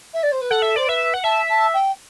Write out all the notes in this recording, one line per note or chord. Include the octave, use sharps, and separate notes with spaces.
E5
D5
C5
B4
A4 F#5
E5
C5 D5
B4 E5
F#5
E5 A5
A5
G5